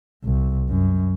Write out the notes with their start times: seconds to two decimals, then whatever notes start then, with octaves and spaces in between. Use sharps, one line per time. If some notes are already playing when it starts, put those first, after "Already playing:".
0.24 C2
0.69 F#2